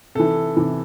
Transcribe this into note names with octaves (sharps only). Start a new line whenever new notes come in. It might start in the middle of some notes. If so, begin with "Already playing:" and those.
C3 E3 A4
C3 E3